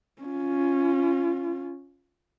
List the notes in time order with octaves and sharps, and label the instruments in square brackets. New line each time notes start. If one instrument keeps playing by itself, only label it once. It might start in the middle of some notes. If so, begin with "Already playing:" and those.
[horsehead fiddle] C#4 F4